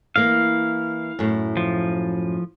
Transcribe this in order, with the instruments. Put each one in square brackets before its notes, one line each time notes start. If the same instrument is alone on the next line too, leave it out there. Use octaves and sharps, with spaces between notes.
[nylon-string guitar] E3 A#3 [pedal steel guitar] F5
[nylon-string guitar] F#2 A2
[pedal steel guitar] F3